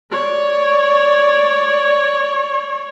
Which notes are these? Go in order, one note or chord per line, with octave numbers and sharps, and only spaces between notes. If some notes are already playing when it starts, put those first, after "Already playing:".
C#5 D5